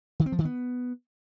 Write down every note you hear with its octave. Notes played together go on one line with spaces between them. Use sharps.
D#3
C4
F3
D#3
B3